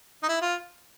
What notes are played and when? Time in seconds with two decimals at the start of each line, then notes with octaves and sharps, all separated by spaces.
0.23 D#4
0.29 E4
0.42 F4